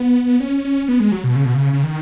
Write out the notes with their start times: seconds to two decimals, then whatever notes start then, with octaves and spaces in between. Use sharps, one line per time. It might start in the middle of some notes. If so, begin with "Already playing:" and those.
Already playing: B3
0.40 C#4
0.65 C#4
0.88 B3
1.00 G#3
1.12 F#3
1.24 B2
1.35 C#3
1.45 B2
1.54 C#3
1.73 C#3
1.83 D#3